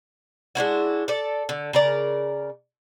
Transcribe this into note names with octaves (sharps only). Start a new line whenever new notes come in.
G#3 D4 E4 F#4
A4 D5
D3
C#3 A#4 D5